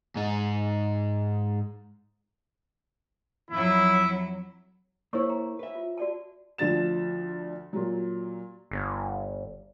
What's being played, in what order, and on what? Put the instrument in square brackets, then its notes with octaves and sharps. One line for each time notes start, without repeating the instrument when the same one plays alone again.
[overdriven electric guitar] G#2 D#4
[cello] F2 F#3 [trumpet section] E4
[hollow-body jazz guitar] A#3 E4 [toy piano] C5 C#5 C#6
[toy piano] A#5
[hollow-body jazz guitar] B4 E5
[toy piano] F4
F#4 D5 A5
[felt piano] D2 F3 D4 A6 E7
A#2 F#3
[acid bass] G1